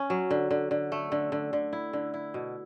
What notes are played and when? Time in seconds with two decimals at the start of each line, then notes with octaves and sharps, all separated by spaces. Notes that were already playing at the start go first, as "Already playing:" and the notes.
Already playing: C#4
0.10 F#3
0.31 D3
0.51 D3
0.71 D3
0.92 A3
1.12 D3
1.32 D3
1.53 D3
1.73 E4
1.93 D3
2.14 E4
2.34 B2